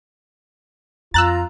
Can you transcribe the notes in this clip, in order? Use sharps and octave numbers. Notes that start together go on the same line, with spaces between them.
F2 F4 A#5 E6 F#6 A6